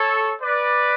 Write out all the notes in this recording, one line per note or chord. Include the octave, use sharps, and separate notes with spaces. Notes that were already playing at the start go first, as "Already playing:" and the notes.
Already playing: A4 C#5
B4 D5